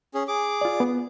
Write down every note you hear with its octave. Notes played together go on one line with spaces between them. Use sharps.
C#4 G#4
G#4 D6
F4 D5
B3